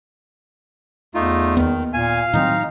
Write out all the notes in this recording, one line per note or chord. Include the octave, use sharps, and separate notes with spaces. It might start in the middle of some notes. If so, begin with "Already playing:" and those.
E2 A3 D#4 F4
D#2 D#3 B3
A#2 F5 G#5
A2 D#3 F#3 C4 D#4